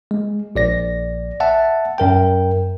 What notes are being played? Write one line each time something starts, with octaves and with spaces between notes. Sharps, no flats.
G#3
A#1 D5 A#6
E5 F#5 A5
F#2 A#4 G5